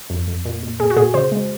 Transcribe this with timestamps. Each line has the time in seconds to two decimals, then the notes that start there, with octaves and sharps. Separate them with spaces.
0.10 F2
0.27 F2
0.45 A#2
0.63 A#2
0.80 A#2 G#4
0.90 F#4
0.96 A#2 G#4
1.14 C#3 C5
1.32 G#3